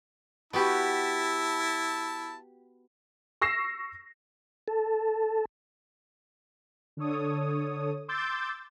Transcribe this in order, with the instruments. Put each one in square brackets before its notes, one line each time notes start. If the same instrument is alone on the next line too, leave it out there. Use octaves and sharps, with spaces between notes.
[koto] B3 F#4 G4 [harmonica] E4 A5
[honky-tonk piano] C#6 E6 A#6 C7 E7
[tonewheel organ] A4
[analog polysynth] D3 D4 A4 C#5 D#6
C6 D6 E6 G6 A6